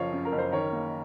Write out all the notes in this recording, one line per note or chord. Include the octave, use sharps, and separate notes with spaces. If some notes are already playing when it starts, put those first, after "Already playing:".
Already playing: F#1 F3 C#5 F5
F#2
A#4
F#1
C5
D#3 A#4 C#5
A#3